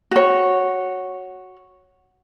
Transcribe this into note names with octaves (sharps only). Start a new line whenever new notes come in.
F#4 C#5